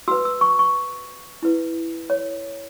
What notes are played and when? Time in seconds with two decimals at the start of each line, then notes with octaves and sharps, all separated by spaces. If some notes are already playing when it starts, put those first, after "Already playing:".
0.08 F#4 B4 E6
0.25 E6
0.41 C#6
0.59 C#6
1.43 E4 B4
2.10 C#5